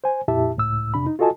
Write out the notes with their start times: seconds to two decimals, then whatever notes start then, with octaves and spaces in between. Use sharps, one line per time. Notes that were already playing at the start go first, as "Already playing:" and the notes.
0.04 C5 G#5
0.28 F2 A#2 E4 G4 E5 A5
0.57 C#2 A2 E6
0.94 F2 C3 D4 B5
1.07 D#4
1.19 F4 F#4 A4 D#5 G#5 A5